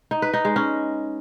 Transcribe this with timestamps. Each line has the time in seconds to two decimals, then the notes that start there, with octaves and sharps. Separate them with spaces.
0.11 D#4
0.22 B4
0.33 D#4
0.45 G#3
0.56 C#4